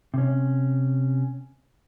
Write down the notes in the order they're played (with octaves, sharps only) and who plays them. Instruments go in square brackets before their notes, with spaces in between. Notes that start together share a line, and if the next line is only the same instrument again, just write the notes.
[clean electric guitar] C3 C#4